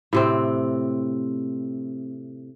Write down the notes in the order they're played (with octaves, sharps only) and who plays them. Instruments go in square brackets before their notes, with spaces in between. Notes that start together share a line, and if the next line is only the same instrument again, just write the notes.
[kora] A2 C3 C4